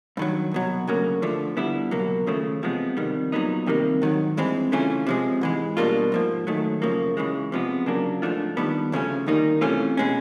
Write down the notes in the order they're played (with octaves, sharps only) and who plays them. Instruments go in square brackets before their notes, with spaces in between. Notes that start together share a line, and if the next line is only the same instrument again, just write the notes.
[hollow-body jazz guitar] G2 D#3 F#3
C2 B2 F#3
D2 C#3 F#3 A#3
D3 F3 A3
D3 G3 B3 E4
C#2 B2 F#3 A#3
D#2 C#3 F3 A3
E2 C3 F3 G#3 B3
F2 C3 D#3 G3
A#2 F#3 B3 D#4
F2 C3 D#3 G3 A#3
G#2 D#3 F#3
G2 E3 G#3 C4
C#3 E3 A3 C#4 F4
C3 F3 G#3
G#2 E3 G#3
B2 G3 A#3 D4 F4
G#2 F3 A#3
G#2 D#3 F#3 A3
F#2 C#3 F3 A#3
E2 C#3 E3 G#3
C3 F3 G#3 B3
C#3 F#3 A#3 D4
G#2 F3 A3 D4 F4
D#2 D#3 G3 B3 D4
D2 C#3 F3 A3 C#4
G2 D#3 G3 A#3 D#4
C3 E3 A3 C#4 F4
B2 G#3 C#4